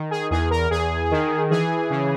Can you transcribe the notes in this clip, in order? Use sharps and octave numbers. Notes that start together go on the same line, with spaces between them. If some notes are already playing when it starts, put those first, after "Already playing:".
Already playing: D#3
G#4
E2 G#4
A#4
E2 G#4
D#3
E3 G#4
C#3